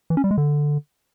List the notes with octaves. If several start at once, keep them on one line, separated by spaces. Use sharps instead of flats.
E3
C#4
G3
G#3
D3